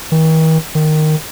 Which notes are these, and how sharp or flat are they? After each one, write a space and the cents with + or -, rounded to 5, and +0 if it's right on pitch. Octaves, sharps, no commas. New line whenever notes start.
D#3 +45
D#3 -10